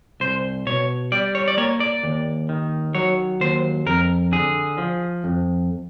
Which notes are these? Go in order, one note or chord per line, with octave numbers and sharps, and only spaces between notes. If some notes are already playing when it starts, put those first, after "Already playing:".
C2 C5
B2 C#5
G3 D5
C#5
D5
A#3 C#5
D5
D#2
D#3
F#3 C#5
D#2 C5
F2 A#4
D3 G#4
F3
F2